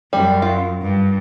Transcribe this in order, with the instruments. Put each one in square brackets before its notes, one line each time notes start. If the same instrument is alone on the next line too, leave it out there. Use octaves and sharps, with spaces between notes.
[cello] F#2 [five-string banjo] G3
[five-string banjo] F4
[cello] G2